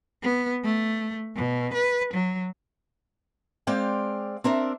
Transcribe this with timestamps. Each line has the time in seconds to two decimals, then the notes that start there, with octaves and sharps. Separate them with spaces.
0.23 B3
0.64 A3
1.36 B2
1.74 B4
2.14 F#3
3.67 G#3 C4 D5 F5 G5
4.44 C4 D4 A#4 E5